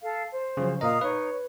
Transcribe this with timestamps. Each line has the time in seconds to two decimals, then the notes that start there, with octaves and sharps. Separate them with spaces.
0.04 A4 F5
0.32 C5
0.57 C#3 F3 F#3
0.81 A#2 A#4 D#5 F5 A#5 D#6
1.01 D#4 B4 C#5